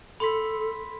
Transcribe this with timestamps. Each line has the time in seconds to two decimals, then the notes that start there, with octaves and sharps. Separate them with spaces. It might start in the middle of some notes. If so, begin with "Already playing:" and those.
0.20 A4 B5 C6 B6